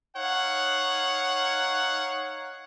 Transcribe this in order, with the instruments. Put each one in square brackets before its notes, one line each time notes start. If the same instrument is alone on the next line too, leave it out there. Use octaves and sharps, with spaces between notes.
[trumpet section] D#4 C#5 F5 F#5